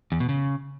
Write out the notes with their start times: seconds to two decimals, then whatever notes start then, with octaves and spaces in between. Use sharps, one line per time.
0.12 E2
0.20 B2
0.29 C#3